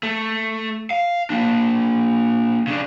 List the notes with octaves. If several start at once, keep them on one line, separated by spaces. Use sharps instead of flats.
A3
F5
A#3 D4
C#3 D4